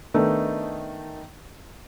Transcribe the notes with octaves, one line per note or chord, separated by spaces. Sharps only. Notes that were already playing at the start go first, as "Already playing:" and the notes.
D#3 A3 B3 D4 D#4